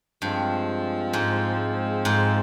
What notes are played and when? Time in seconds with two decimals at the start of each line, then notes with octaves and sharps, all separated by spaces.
0.21 G2 F3 G#3 C4 F4
1.13 G#2
2.05 G#2